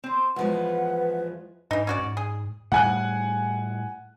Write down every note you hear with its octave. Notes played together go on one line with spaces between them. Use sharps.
C4 C5
E2 A2 F3 G#3 B4 F#5
G#2 E3 D#4
C#4 F#4 D5
G#2
G#4
A2 G3 F#5 G#5 F#6